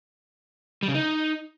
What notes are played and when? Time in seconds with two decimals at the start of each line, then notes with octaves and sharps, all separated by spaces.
0.83 G3
0.88 C#3
0.94 D#4